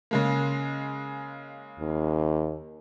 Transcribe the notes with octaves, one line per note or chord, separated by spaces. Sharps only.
C#3 G#3 A#3
D#2